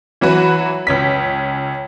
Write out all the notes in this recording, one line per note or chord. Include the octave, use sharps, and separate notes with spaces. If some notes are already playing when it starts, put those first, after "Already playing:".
E3 F#3 F#4 B4
C#2 C#4 B6